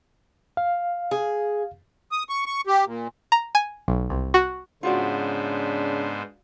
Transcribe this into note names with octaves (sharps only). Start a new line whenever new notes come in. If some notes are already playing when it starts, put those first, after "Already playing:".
F5
G#4
D#6
C#6
C#6
G4
A#2
A#5
G#5
B1
C2
F#4
G#2 C#3 B3 D4 F4 F#4 C5 D5